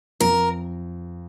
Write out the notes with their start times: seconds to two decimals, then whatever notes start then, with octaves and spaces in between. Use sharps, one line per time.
0.20 F2 A#4